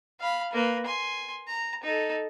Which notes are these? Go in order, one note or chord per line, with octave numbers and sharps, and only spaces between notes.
F5 B5
A#3 B4
G#5 C6
A#5
D#4 A4